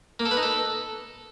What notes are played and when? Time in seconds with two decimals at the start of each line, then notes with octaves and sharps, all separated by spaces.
0.20 A#3
0.25 A4
0.31 B4
0.37 D#4
0.43 A4